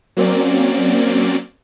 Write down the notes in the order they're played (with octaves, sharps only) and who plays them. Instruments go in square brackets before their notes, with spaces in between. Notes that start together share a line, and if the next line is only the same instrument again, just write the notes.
[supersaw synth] F#3 A#3 C4 C#4 D5